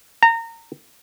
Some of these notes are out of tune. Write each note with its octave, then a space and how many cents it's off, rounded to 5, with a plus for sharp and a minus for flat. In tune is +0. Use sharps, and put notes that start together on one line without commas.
A#5 -25